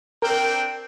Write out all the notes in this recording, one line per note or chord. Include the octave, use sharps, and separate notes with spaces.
C4 D4 A#4 G5